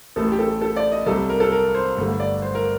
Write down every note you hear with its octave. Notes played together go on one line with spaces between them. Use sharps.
A1 A2 A3 A4
G4
A4
A4
D5
D#5
C2 C3 G3 A4
A#4
A4
A#4
C5
G1 G2 D3 A3
D5
C5
A#4